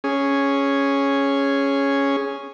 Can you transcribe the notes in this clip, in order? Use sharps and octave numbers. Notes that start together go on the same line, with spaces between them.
C#4 G#4